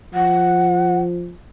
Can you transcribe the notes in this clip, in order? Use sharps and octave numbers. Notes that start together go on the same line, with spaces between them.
F3 F#5